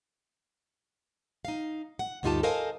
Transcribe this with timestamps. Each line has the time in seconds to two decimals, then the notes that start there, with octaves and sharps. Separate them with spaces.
1.45 D#4 F5
1.99 F#5
2.23 D2 G2 D#4 F4 G4 A5
2.43 A4 A#4 C5 D#5 F5 G#5